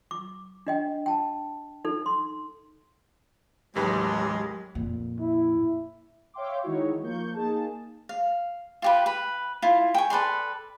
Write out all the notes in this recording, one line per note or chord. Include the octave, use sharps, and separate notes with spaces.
D6
D4 D#5 G5
G5 A5
D#4 A4
C6
A1 D#2 F#3 G#3 G4 B4
F2 A#2
E4
C#5 E5 F5 G5 C6 D6
D#3 G#3 D#4 E4 F#4 C#5
F3 A#3 C#6 G6
A#3 D#4 G#4 A5
F5
F4 G4 B4
B4 B5
E4 F4
G5 G#5 C#6
A4 B4 D5 C6